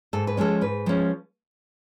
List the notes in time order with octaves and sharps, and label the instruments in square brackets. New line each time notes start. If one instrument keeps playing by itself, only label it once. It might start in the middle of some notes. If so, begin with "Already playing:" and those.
[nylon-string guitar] G#2 A4
B4
F3 G#3 C#4 A4
G#2 B4
F3 G#3 C#4